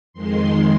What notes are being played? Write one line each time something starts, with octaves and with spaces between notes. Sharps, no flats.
F2 D#3 G#3 C6